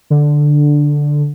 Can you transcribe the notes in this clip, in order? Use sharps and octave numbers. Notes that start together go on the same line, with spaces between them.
D3